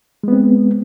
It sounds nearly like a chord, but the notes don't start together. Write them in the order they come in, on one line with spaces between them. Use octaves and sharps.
G#3 B3 C4